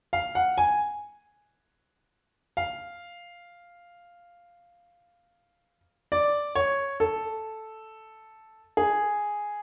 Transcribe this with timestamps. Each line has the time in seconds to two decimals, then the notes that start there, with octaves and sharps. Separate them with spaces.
0.13 F5
0.35 F#5
0.58 G#5
2.57 F5
6.12 D5
6.55 C#5
7.00 A4
8.77 G#4